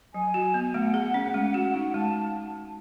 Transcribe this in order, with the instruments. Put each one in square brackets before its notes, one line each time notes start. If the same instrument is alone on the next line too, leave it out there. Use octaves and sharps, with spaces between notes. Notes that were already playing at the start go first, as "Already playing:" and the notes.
[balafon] F#3 [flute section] G#5
[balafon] F#4
B3
[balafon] A3 [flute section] F#5
[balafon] G#4
C#4
G#3
F#4
D#4
[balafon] G#3 [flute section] A5